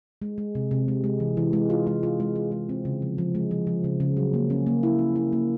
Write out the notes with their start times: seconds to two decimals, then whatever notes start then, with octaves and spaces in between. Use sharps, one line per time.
0.22 G#3
0.38 G#3
0.55 C3
0.71 C3
0.88 G#3
1.04 G#3
1.20 E3
1.37 E3
1.53 G#3
1.70 F4
1.87 G#3
2.03 F4
2.20 G#3
2.36 F4
2.52 G#3
2.69 C4
2.85 C#3
3.02 F3
3.18 F3
3.35 G#3
3.51 F3
3.67 F3
3.84 C#3
4.00 C#3
4.17 F#3
4.34 A#3
4.50 C#4
4.66 A#3
4.83 E4
4.99 C#4
5.16 E4
5.33 A#3